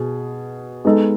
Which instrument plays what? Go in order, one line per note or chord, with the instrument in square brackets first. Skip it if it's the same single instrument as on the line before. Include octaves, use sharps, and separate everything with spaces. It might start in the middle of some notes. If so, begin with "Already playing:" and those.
Already playing: [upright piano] B2 G#4
G#3 B3 D#4 A4